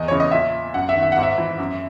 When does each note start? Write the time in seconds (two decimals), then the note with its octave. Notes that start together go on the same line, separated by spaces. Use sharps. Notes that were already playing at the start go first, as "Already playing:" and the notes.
Already playing: E2 D#5
0.08 C#3 E3 C#5
0.20 D#5
0.31 A#2 E5
0.74 F#2 F#5
0.89 E5
0.96 D#3
1.03 E5
1.12 G#2 F#5
1.23 E5
1.38 E3
1.58 F#2